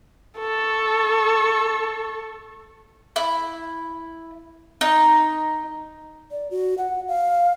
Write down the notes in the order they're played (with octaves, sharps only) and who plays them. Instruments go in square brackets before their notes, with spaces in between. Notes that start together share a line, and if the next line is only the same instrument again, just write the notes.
[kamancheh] A4 C#6
[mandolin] E4
D#4
[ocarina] D5
F#4
F#5
F5